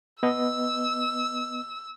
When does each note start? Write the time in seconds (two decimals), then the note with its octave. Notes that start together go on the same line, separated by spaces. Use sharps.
0.23 B3 D#5 E6